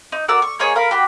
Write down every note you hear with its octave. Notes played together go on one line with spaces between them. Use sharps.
D#4
F#4 A#4 D5 E6
C#6
A#3 D#4 G#4 C#5
A#4 F5 B5
F#4 G4 B5